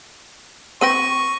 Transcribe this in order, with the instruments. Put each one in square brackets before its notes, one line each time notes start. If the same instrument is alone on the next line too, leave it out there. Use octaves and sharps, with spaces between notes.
[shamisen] C4 B4 G5 [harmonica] C#6 [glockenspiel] A#6 D#7